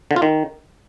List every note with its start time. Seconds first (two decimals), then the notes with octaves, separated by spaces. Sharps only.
0.11 D3
0.16 F4
0.22 D#3